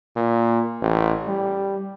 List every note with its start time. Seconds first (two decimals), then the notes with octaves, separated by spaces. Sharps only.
0.16 A#2
0.81 A1
1.28 G3